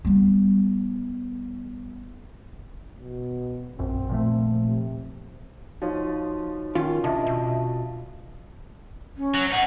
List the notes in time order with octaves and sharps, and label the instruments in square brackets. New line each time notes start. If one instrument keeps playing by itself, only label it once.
[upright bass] G3 B3
[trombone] B2
[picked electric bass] A#1 F#2 [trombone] C4
[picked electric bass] A#2 F3 A3
[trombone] C3
[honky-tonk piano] F3 [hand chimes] D#4 F#4 C#5
[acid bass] D#3 [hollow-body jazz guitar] C#4 F4
[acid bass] C3 [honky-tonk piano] D4 E4 D#5 [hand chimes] A5
[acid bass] B2
[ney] C#4
[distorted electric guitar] F#3
[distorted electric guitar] D#4 G#4 [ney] F#5